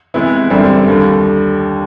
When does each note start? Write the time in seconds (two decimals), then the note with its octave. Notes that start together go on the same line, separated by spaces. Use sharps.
0.14 C3 E3 G#3 B3 E4
0.50 F#2 D3 G3 C4
0.88 D#2 D3 G3